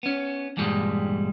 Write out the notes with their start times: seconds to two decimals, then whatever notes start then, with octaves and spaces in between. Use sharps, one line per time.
0.03 B3 C#4
0.57 E2 G2 A#2 G3 G#3